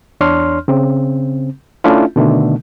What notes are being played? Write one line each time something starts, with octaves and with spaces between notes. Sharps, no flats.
E2 D4 C#5 C6 F6
C#3 C4
A3 C#4 D4 E4 F4
B2 D3 D#3 A3